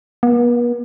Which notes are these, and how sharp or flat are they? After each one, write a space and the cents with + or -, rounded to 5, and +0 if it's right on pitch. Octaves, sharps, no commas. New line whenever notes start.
B3 -45